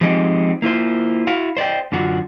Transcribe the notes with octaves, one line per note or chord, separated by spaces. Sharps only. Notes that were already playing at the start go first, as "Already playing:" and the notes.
F3 G#3 C4 D#4 G4 D#5
A#3 E4 F4 C5
E4 F#4 F5
C5 D5 D#5 G5
F#2 D3 F4 F#4